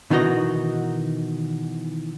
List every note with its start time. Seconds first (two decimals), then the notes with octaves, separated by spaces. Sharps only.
0.10 B2 D#3 E3 D#4 F#4 D#5